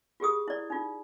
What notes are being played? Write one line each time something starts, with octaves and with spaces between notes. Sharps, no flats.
F4 G4 G#4 D#6
E4 D5
D#4 F4